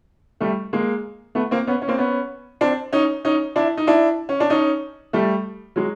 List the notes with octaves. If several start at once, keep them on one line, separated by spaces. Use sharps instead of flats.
G3 A3
G#3 A#3
A3 B3
A#3 C4
B3 C#4
C#4
A#3 C4
B3 C#4
C4 D4
C#4 D#4
C#4 D#4
D4 E4
D#4
D4 E4
C#4
D4
C#4 D#4
G3 A3
F#3 G#3